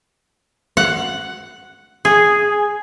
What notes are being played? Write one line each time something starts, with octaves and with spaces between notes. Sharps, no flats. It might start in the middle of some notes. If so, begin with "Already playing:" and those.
F#5
G#4